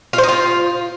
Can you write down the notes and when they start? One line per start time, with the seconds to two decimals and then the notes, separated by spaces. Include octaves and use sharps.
0.13 F4
0.18 C5
0.23 D#4
0.29 F4